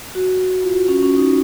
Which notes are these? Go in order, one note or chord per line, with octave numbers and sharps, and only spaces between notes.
F#4
F4
F#4
C#4
C#4
D#4